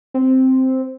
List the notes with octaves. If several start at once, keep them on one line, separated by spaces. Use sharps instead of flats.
C4